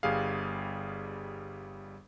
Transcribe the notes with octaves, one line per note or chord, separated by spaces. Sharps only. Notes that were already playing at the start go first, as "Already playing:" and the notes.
G1 G3 G#4 F5